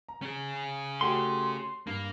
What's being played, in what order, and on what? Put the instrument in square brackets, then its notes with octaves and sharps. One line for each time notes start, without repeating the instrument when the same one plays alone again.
[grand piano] A#5
[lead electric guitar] C#4 G#4
[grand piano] A3 F#4 G4 [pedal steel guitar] C6
[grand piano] G2 [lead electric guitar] A#3